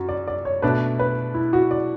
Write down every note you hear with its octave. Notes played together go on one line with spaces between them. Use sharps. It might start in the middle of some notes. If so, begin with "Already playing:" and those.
Already playing: F#2 F#4
D5
D5
C#5
B2 A3 D4 B4
B4
E4
F#4
D5